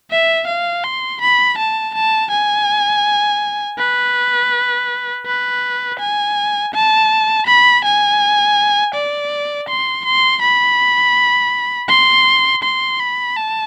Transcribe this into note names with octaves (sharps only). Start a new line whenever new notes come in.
E5
F5
C6
B5
A5
A5
G#5
B4
B4
G#5
A5
B5
G#5
D5
C6
C6
B5
C6
C6
B5
A5